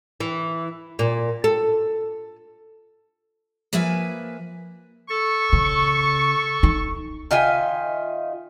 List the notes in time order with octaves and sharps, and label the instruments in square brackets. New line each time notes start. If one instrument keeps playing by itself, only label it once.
[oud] E3
A#2
A4
[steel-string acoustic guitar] F3 A#3 B4 E5 G#5
[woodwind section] A4 C#6
[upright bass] C#3
D#4
[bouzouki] D#3 F4 E5 G#5